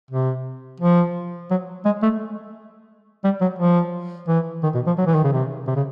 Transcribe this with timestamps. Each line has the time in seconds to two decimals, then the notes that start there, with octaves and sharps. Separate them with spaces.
0.11 C3
0.80 F3
1.50 F#3
1.85 G#3
2.02 A3
3.24 G3
3.41 F#3
3.58 F3
4.28 E3
4.63 D#3
4.74 B2
4.87 F3
4.98 F#3
5.07 E3
5.15 D#3
5.24 C#3
5.32 C3
5.67 C3
5.76 C#3